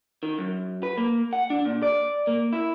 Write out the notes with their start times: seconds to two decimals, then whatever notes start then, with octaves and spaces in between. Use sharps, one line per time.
0.23 D#3
0.39 F#2
0.83 B4
0.97 A#3
1.33 F#5
1.50 D4
1.65 A#2
1.83 D5
2.27 A#3
2.53 E4